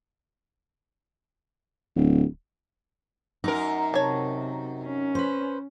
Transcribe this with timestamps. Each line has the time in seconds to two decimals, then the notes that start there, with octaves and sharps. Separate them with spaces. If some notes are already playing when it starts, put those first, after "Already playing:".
1.96 D1
3.44 F#2 D#4 A#4
3.94 C3 C#5 A5
4.85 C#4
5.15 B4 C5